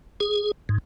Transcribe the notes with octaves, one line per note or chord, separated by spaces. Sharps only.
G#4
G#2